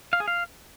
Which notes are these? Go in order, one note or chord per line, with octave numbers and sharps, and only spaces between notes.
F5
G#4
F5